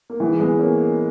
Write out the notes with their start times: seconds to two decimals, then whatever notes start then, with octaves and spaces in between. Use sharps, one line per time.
0.10 A#3
0.20 E3 G#3
0.40 G#3 B3
0.59 A#3 C#4